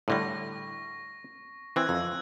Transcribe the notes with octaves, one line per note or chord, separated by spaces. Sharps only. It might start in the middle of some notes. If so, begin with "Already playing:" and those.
A2 D3 G3 C#6 A#6
E3 C4 E6 F#6 G#6
F2 E6